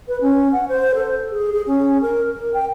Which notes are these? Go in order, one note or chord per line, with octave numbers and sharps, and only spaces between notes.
B4
C#4
F#5
C5
A4
G#4
G#4
C#4
A#4
A#4
G5